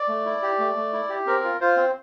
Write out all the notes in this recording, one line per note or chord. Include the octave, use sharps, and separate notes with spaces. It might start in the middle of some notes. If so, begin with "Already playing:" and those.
Already playing: D5
A3
E4
G4
A3
A3
E4
G4
C4 A#4
F4
F4 C5
C4